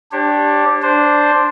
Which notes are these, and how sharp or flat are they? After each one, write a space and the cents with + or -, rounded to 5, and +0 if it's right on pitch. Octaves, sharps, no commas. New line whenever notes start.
D4 +0 G4 +0 C#5 -45
D4 +0 C5 +0